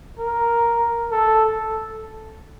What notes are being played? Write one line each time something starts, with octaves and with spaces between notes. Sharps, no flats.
A#4
A4